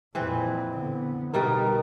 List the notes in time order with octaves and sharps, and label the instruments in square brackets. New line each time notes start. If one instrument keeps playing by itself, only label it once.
[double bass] F2 A#2 [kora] E3 C4 B4
[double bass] D3 B3
[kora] B2 G3 A3 [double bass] D#4 [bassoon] A#4